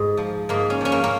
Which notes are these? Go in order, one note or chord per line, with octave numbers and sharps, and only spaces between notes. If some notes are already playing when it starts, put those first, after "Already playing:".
Already playing: G#2
F3
G#2 A#3
C#4
F3 C#4
A#3
A#3